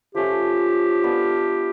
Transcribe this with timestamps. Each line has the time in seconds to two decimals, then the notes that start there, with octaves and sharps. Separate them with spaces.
0.15 F3 A3 C#4 G4
1.04 B3 D4 F4